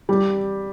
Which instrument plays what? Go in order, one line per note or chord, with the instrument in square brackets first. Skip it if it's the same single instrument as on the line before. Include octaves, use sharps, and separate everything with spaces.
[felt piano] G3